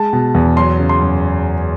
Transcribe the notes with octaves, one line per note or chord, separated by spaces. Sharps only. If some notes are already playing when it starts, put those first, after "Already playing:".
Already playing: G#3 A5
B2
E2
F#3 C6
C#3
C6
F#2